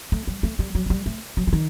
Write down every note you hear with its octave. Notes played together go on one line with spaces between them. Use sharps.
A3
G3
A3
G3
F#3
F#3
G3
A3
F#3
E3
D#3